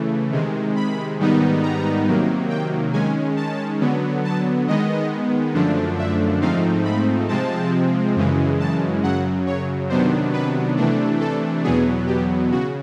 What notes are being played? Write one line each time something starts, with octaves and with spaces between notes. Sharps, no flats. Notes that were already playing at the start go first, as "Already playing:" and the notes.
Already playing: C#3 E3 A3
C3 D#3 G#3
B5
G#2 D#3 G3 B3 D#4
A#5
C3 D#3 F#3 A#3
G5
D#3 G#3 C#4 G#5
A5
D3 F#3 B3
A5
D#3 G#3 B3 D#5
F#2 D3 F3 A3 D4
E5
G#2 F3 A3 C4 D#4 F5
B5
C3 F3 G#3 C4 A5
F#2 C#3 E3 G#3
A5
F#2 C#3 F#3 F#5
C#5
C3 D#3 F#3 B3 D4 C5
B4
C3 E3 A3 D4
A4
E2 B2 F#3 B3 G#4
G4
C#3 F#4